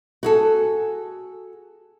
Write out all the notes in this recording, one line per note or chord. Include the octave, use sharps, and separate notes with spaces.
F#4 G#4 A4